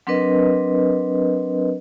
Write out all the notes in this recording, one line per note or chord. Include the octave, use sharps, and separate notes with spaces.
F#3 C4 D4 A#4 B4 D#5